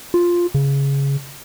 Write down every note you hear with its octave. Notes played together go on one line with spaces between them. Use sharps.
F4
C#3